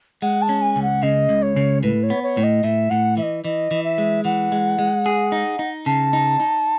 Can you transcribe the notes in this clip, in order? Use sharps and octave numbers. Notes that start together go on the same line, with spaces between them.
G#3 F#5
A5
C#4
G#5
C#2
F#5
C#3 D#5
C#2
C#5
C#3
A2 B4
C#5
B3
C#5
A2
D#5
A2 E5
A2 F#5
E3 E5
D#5
E3 D#5
E3
E5
G#3
E3 F#5
G#3
G#3
G#4
D#4
D#4
C#3 A5
D#4
D#4